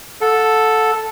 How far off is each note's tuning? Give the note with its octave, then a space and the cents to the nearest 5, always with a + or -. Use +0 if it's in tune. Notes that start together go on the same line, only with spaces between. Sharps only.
A4 +0 F#5 -30